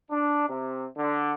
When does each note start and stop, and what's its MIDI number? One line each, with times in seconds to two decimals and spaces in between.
0.11 0.44 62
0.48 0.85 48
0.97 1.33 50